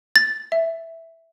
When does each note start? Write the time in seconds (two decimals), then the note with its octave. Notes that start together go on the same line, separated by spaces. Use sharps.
0.16 A6
0.52 E5